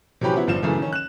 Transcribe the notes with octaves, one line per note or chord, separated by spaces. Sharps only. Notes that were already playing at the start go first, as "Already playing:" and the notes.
C3 E3 F#3 C#4 G4 B4
F3 F#3 B3 E4
G1 G2 F3 F4 E7
F#2 C#3 E3 A3
D#3 C#4
F#6 E7